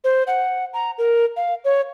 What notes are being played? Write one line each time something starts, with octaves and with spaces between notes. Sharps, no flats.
C5
F#5
A#5
A#4
F5
C#5